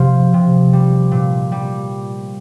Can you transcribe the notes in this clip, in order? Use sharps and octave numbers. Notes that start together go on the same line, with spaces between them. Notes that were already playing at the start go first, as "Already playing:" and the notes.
Already playing: C3 F3 F5
C3
G3
A#2
G3